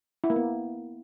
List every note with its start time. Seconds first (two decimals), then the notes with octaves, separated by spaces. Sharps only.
0.24 E4
0.30 A#3
0.36 B3